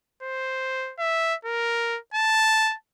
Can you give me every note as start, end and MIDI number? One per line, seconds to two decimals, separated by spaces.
0.23 0.93 72
0.99 1.34 76
1.45 1.98 70
2.14 2.74 81